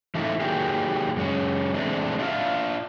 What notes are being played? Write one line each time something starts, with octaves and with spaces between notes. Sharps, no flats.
E3 F3 A3 D#4 E4
D#3 F#3 A#3 G4 G#4
F#2 G#3 C#4
E3 G#3 A3 C4 D4
D4 E4 F4 G4 E5 F5